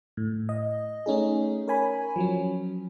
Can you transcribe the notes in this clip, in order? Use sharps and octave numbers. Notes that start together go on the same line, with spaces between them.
A2
D#5
A3 C#4 D#4 G#4
A#4 C#5 G#5 B5
F3 F#3 C#4